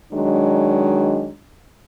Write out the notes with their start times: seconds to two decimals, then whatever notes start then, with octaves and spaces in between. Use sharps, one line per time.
0.13 D#3 F#3 G#3 D4